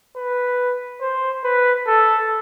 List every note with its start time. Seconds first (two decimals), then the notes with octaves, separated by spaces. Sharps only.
0.16 B4
1.01 C5
1.44 B4
1.87 A4